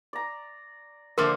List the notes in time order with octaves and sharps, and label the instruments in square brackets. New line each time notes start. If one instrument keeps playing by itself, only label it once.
[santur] D5 A#5
[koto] D3 F3 A#3 [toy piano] A#4 [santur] C5 D5 E5